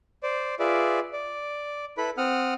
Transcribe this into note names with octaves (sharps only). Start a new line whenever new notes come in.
C5 D5
F4 G#4 B4 D5 E5
D5
E4 A4 B4 B5
C4 F#5 D#6 F6